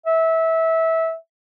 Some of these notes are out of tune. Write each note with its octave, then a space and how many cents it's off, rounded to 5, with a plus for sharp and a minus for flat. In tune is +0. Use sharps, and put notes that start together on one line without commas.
E5 -20